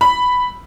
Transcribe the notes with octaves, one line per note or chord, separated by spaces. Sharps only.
B5